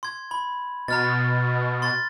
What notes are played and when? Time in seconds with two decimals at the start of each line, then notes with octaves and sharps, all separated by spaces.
0.03 C6 G#6
0.31 B5
0.88 B2 A#5 F6 A6
1.82 C6 A6